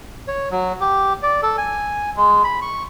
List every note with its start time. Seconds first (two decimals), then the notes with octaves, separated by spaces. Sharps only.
0.28 C#5
0.51 F#3
0.81 G4
1.22 D5
1.43 A4
1.58 G#5
2.17 G#3
2.44 B5
2.62 C#6